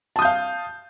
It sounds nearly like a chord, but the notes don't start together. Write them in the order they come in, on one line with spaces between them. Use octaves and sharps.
A5 D#6 G6 F5